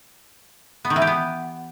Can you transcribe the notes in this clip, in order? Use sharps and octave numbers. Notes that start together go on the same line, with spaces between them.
B3
D#3
E3
G4
B3